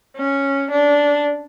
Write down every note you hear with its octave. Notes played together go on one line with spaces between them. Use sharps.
C#4
D4